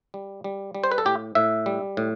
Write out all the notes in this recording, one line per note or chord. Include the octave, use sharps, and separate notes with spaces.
G3
G3
G3
C5
B4
A4
A2 G4
A2 E5
G3
A2